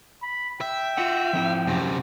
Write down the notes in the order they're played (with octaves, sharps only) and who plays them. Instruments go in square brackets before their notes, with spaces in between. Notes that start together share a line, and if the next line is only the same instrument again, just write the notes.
[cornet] B5
[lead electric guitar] E5 [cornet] G5
[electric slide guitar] F4 F#4 F#5
F3 C4 E4
[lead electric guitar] F#2 C3